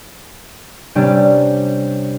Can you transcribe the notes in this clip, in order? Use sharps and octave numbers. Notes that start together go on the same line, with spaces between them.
C3 G3 C#4 D4 G4